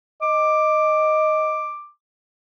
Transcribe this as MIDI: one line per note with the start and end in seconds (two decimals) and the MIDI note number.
0.22 1.71 75
0.22 1.90 86